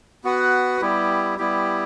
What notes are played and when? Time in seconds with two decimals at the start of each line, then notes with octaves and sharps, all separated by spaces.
0.24 B3 F#4 B4 F#5
0.81 G3 B3 E4 G4
1.38 G3 B3 E4 G4